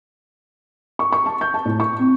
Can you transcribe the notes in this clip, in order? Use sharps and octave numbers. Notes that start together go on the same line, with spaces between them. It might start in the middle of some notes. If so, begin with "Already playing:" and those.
C#6
C#6
A5
G6
A5
A2
C#6
C4